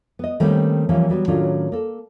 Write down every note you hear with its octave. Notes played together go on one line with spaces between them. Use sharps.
B3 D#5
D#3 G3 A3 A#3 C4 C#4
E3 F3 G3 A#3 C#4
F#3 G3 B3
A2 D#3 F#3 C#4 D4 F4
A#3 A4